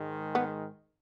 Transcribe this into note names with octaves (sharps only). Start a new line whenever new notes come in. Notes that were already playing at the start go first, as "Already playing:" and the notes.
Already playing: G#2 D#3 G#3
B3